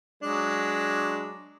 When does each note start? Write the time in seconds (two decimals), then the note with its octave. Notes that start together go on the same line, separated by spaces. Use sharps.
0.23 F#3 G#3 D4